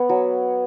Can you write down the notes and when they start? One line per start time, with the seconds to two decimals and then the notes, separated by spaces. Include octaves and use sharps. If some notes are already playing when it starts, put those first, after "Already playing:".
Already playing: B3 B4 C#5
0.09 F#3